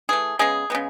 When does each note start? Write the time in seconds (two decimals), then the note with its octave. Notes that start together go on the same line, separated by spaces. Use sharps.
0.09 E3 A3 G#4
0.39 C#3 G#3 B3 G#4
0.70 C#3 G#3 B3